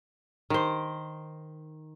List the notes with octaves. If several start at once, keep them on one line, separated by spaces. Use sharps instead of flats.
D#3 C5